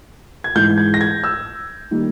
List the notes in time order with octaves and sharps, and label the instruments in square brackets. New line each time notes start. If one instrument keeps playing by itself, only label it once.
[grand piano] G#6
G#2 E3 G#3 G6
G#6
A#6
G#6
E6
D#3 G3 A#3